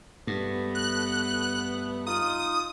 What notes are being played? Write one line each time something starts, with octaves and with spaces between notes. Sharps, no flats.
G2 A3 B3
F#6
D#4 F4 D#6